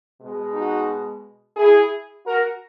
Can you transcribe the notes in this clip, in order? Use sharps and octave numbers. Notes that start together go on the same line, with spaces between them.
B2 G#3
D#4 F#4
E4 G#4
F#4 A#4